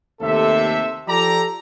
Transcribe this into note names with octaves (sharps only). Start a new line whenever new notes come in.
D#2 C3 A3 A4 E5
F3 G4 A4 D5 A#5